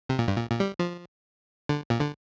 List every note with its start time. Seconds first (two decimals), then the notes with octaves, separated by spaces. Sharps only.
0.09 C3
0.19 A#2
0.28 G2
0.36 A#2
0.50 A#2
0.60 G3
0.79 F3
1.69 D3
1.90 A#2
2.00 D3